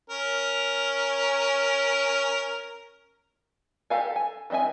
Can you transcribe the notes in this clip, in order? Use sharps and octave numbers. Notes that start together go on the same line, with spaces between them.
C#4 A#4
G4 A4 F5 G#5
G#5
E3 C4 D#5 E5 G#5